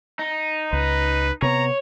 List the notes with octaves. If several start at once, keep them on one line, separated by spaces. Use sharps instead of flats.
D#4
C#2 B4
C3 B3 C#5 A#5